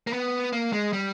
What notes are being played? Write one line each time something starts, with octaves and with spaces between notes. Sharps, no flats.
A#3
B3
A#3
G#3
G3